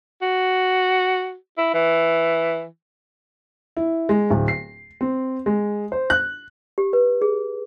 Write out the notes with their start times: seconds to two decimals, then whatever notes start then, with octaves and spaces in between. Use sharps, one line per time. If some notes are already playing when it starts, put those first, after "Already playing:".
0.22 F#4
1.58 E4
1.74 E3
3.77 E4
4.09 G#3
4.30 D1
4.48 C7
5.01 C4
5.46 G#3
5.92 C5
6.10 F#6
6.78 G4
6.93 B4
7.22 G#4